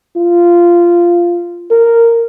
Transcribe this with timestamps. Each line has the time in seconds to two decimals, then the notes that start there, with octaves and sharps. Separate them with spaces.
0.17 F4
1.71 A#4